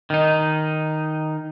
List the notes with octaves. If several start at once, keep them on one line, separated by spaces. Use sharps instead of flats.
D#3 D#4